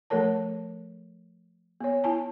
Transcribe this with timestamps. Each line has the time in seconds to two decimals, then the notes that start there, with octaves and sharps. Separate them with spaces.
0.10 F3 A3 A4 A#4 C#5 A5
1.81 B3 C#5
2.04 E4 G#5 A5